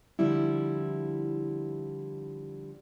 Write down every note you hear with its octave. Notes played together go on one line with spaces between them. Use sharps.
D3 F3 G3 E4